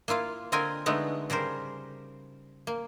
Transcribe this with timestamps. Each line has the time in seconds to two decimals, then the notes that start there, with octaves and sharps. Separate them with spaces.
0.08 A#3 E4 F4 F5
0.52 D3 C4 F4 A#4 D#5 G#5
0.86 D3 G#3 A3 B3 D#4
1.30 C#3 G3 A#4 C5
2.67 A#3